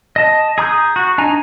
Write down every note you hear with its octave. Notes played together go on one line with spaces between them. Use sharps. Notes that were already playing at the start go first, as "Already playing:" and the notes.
D#5 A5
G#4 A#5 D#6 G6
F#4
D4 D#4 G#5 A#5